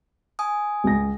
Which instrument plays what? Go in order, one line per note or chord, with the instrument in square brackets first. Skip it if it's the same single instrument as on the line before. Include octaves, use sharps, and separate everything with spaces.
[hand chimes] G#5 D#6
[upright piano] C#2 A#6